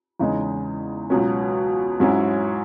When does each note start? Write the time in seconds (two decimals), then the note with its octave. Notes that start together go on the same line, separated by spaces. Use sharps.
0.19 E2 C#3 G#3 D#4
1.10 C#2 B2 F#3 C#4
2.00 G#2 F#3 C#4 E4